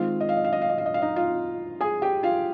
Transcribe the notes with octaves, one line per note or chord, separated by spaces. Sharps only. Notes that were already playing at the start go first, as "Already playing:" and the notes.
Already playing: D#3 G#3 C4 F4 F5
D#5
F5
D#5
F5
D#5
F5
D#5
F5
D#5
F5
D#4 D#5
F4 F5
G#4 G#5
G4 G5
F4 F5